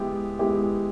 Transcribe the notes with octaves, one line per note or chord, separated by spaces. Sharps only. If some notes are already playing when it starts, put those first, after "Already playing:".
Already playing: G#3 B3 E4 G4
G#3 B3 E4 G4